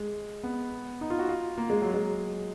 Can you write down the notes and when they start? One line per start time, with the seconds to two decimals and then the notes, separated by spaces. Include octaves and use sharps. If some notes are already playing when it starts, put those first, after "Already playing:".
Already playing: G#3
0.44 B3
1.01 D#4
1.10 F4
1.19 F#4
1.29 F4
1.58 A#3
1.70 G#3
1.82 F#3
1.94 G#3